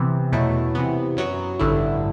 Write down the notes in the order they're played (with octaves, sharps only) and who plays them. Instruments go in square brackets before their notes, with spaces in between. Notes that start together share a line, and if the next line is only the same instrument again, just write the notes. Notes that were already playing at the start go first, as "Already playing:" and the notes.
Already playing: [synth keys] C3 E3 B3
E2 B2 F#3 A3 E4
C3 E3 B3
F#2 F#3 B3 F#4
A1 G2 D3 A3 E4